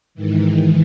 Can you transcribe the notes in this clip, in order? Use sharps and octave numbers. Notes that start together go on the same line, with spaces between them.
G#2 D#3 E3